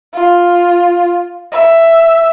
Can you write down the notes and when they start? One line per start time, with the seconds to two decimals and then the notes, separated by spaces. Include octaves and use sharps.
0.14 F4
1.52 E5